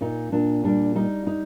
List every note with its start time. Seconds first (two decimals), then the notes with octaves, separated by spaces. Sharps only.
0.01 A#2 D#4
0.32 A#2 D4
0.64 G3 D4
0.95 G3 D#4
1.27 D#4